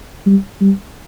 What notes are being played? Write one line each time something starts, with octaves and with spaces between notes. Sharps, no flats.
G3
G3